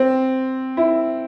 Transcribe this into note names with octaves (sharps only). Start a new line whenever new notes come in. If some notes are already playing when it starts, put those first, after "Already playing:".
Already playing: C4
E4